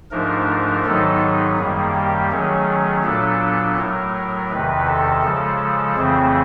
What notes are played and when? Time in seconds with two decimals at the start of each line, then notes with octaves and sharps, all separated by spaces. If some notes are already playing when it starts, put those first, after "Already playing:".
0.11 G#2 F3 A3 D4 A#4
0.84 G#2 D#3 F#3 B3 D#4 A4
1.21 G#4
1.58 F#2 D#3 G3 A#3
1.94 G4
2.30 D#3 F#3 A3 C#4 G#4
3.04 A#2 F#3 B3 D4 A4
3.77 A2 F#3 A3 A#4
4.50 E2 C3 D#3 B4
4.87 A4
5.23 C#3 F3 G#3
5.96 F2 C#3 E3 A3 C4 G#4